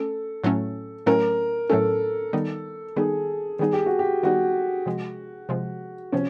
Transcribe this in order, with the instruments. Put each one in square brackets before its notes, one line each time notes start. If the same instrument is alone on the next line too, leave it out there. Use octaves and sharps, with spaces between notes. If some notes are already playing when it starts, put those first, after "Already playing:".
Already playing: [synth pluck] A3 C#4 [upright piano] A4
[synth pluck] A2 F#3 A3 C#4
[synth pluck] A2 F#3 A3 C#4 [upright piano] A#4
[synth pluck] A2 F#3 A3 C#4 [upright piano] A4
[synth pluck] D#3 G3 B3 D#4
[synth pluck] D#3 G3 B3 D#4 [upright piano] G#4
[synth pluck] D#3 G3 B3 D#4 [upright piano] G#4
[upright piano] G4
F#4
G4
[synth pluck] D#3 G3 B3 D#4 [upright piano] F#4
[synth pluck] C3 F3 G#3
C3 F3 G#3
[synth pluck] C3 F3 [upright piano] C#4